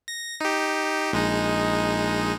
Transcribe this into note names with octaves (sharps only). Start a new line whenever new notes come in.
A#6
D#4 G4
A#1 G#3 D#4